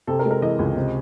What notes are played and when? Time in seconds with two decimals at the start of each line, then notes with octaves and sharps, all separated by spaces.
0.07 C3 A4
0.19 A#4
0.25 G#3
0.31 A#4
0.42 E3 D#5
0.59 C#2
0.76 C3